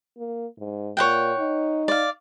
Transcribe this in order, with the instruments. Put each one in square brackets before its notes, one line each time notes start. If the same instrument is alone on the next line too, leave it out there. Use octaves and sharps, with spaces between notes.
[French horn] A#3
G#2
[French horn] A#2 [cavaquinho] C#5 F#5 G5
[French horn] D#4
[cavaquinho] D5 F5